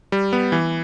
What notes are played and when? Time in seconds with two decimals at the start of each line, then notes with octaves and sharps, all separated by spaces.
0.12 G3
0.33 B3
0.52 E3